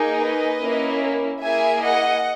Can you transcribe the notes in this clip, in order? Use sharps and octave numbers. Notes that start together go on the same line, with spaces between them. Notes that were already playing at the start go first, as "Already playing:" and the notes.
Already playing: A#3 D#4 G#4
B4 D#5
A#3 C#4 E4
A#3 E4 G#4 E5 G#5
D#5 F#5